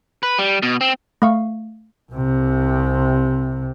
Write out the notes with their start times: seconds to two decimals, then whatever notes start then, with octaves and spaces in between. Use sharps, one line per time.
0.23 B4
0.38 G3
0.63 B2
0.81 C4
1.22 A3 F5 C#6
2.12 C2 C3